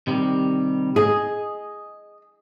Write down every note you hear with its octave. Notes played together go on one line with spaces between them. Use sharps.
C3 D#3 G3
G#4 D#5